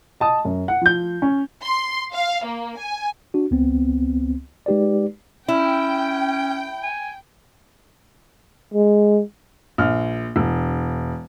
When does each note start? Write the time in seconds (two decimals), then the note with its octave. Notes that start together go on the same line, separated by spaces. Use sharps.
0.20 D#5 A5 D#6
0.45 F#2
0.68 F#5
0.81 F3 G6
1.22 C#4
1.62 C6
2.12 F5
2.44 A#3
2.78 G#5
3.34 D4 F#4
3.51 C#2 B3 C4
4.66 G#3 D#4 G4 B4 D5
5.48 C#4 E4 G5
6.83 G#5
8.74 G#3
9.78 A#1 F6
10.36 E1